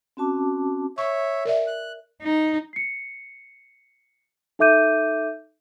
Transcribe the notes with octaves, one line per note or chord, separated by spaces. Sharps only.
C4 C#4 F#4 A5 D6
C#5 E5 C#6
A#4 D5 E5
F#6
D#4
C7 C#7
D#4 A4 E5 D6 G6 D#7